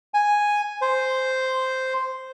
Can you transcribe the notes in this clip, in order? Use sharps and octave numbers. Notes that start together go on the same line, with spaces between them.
G#5
C5